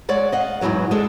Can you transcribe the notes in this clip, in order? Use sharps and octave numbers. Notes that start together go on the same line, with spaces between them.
G#3 C#5 D5 F#5
D#5 F5 F#5
E2 G#2 E3 F#3 B3
G#3 D4 A4